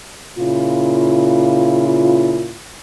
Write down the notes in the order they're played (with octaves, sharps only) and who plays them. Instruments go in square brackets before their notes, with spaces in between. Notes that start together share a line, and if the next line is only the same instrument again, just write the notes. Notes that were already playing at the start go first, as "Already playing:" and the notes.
[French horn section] A#2 C#3 E4 F4